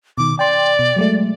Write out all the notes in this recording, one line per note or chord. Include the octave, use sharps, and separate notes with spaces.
B2 D#3 D6
D5 G5 C6
B2
F#3 G#3 A3